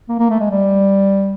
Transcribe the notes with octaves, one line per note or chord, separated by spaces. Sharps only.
A#3
A#3
A3
G#3
G3